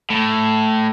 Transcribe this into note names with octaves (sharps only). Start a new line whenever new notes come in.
A2